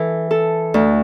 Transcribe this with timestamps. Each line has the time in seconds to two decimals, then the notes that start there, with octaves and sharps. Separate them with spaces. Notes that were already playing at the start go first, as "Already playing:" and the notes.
Already playing: E3 A4
0.31 A4
0.74 D2